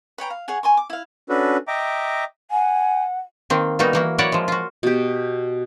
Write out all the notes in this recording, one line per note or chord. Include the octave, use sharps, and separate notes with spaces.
B4 C#5 G5 A#5
F5
G#4 C#5 F#5 G#5
G#5 C6 C#6
D6
E4 F5
C#4 D4 F#4 A4 B4
D#5 E5 G5 A#5 D6
F#5 G#5
D#3 A#3 C4
G3 A#3 B3 D#4 F#4
E3 A#3 F#4
F#3 E4 A#4 C#5 D5 F#5
F3 G#3
F4 F#4
B2 G4